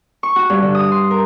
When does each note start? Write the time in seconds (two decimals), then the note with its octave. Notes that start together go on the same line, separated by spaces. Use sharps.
0.23 C#6
0.36 F#4
0.50 G2
0.62 D3
0.75 D#6
0.92 C6
1.11 A#4